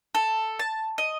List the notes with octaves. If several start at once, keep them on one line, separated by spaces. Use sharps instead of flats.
A4
A5
D#5